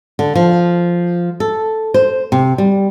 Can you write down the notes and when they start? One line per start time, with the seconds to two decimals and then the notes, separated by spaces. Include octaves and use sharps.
0.19 D3
0.35 F3
1.40 A4
1.94 C5
2.32 C3
2.58 G3